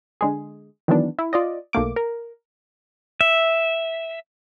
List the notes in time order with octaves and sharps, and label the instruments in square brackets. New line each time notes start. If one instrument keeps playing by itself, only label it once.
[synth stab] D3 G#3 G#4
D#3 E3 F#3 B3 D4
E4
F4 D5 D#5
B1 A3 A#3 D6
A#4
[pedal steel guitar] E5